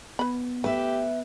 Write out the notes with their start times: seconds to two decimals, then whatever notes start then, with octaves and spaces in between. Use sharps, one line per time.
0.19 B3 B4 B5
0.64 A3 G4 B4 E5